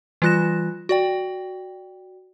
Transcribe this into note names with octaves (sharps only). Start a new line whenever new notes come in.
E3 G3 F4 F#6 A#6 E7
F#4 D5 G5